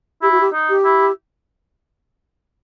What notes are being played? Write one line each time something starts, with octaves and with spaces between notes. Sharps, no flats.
E4 G4
F#4
G4
D#4
G4
E4